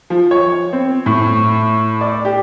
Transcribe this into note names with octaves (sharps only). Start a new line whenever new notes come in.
F3
C#5
C4
A2
D5
G4